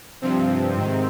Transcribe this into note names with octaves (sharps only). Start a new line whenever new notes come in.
G2 C3 F3 C4
G#2 D#3